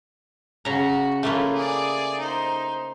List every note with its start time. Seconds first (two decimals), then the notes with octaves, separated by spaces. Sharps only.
0.65 C#3 F#4 A#5
1.23 A3 A#3 C#4 E4 F4
1.55 G#4 D5
2.19 D#4 C5